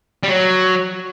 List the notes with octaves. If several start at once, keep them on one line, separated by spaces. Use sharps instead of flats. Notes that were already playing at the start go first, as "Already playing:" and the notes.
G3
F#3